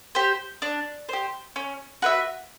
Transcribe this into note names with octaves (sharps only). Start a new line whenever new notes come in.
G4 C5
D4
G4 C5
C#4
F#4 B4 E5